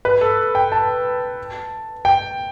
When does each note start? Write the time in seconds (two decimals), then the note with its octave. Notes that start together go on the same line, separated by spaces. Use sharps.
0.05 B4
0.21 A4
0.55 G5
0.72 A5
2.05 G5